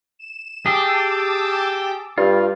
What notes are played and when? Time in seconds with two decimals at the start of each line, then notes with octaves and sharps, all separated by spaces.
0.19 E7
0.66 G4 G#4 A5 D6 E6
2.18 G2 G3 F4